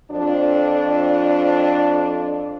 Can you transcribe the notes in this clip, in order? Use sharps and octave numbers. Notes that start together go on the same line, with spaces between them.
F2 F3 D4